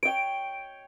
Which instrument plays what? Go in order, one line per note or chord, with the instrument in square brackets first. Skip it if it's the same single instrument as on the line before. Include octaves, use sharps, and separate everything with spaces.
[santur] C#5 G5 [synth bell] D7